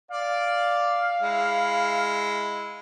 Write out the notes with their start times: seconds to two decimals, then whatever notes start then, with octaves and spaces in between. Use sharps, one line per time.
0.11 D5 F5
1.22 G#3 E4